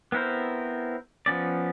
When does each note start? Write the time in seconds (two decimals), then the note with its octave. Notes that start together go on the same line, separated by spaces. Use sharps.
0.12 B3 C4 E4 A#4 C5
1.26 F3 B3 C#4 D5